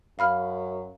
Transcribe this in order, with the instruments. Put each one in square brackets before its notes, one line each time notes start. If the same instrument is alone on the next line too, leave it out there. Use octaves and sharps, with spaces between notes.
[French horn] F#2 [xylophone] F5 B5 F6